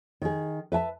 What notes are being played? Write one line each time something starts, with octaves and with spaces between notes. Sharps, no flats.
D#3 G#4
B4 E5 G#5 A5